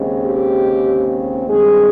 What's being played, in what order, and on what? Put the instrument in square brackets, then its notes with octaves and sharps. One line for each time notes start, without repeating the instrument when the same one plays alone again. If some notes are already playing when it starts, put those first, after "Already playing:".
Already playing: [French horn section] D#2 C#3 G#3 C4
G4
G2 D#3 G#3 C4 G#4